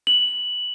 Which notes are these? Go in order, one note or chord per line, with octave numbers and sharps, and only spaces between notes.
F#7